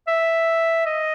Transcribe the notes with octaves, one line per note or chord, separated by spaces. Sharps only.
E5
D#5